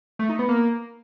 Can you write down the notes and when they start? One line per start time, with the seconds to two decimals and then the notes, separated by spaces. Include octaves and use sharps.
0.19 A3
0.29 D#4
0.39 B3
0.49 A#3